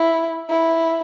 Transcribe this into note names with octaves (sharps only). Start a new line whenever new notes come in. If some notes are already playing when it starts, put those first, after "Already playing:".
Already playing: E4
E4